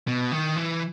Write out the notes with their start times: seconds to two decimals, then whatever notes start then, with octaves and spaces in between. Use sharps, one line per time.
0.08 B2
0.32 D#3
0.56 E3